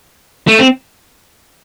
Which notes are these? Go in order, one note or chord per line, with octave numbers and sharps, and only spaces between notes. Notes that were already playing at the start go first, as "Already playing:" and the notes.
A3
C4